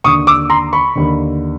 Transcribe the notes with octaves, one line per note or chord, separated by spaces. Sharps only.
D#2 D3 C#6 D#6
D6 E6
A#5 C6
B5 C#6
D#2 D3